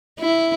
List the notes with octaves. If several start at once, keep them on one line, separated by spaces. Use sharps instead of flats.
E4